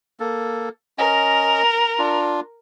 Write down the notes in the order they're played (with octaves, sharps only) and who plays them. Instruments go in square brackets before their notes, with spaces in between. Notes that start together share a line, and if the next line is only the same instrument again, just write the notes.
[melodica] A#3 A4
[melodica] C#4 D#5 [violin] A#4
[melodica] D4 F4